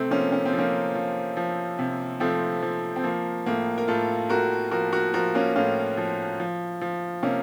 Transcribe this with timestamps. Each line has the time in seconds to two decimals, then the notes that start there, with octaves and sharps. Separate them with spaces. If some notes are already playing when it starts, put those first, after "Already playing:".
Already playing: C3 A3 C4
0.11 F3 A#3 C#4
0.32 C#4
0.45 C4
0.53 F3
0.58 A#3 C#4
0.95 F3
1.37 F3
1.79 C3
2.20 F3 A3 C4
2.62 F3
2.96 C4
3.04 F3 A#3
3.46 A2 A#3
3.78 A#4
3.88 A2 F4 A4
4.30 A2 F#4 A#4
4.71 F3 F#4 A#4
4.92 F#4 A#4
5.14 F3 F#4 A#4
5.35 A#3 C#4
5.56 A2 C#4 F4
5.97 F3
6.40 F3
6.81 F3
7.23 C3 A#3 C#4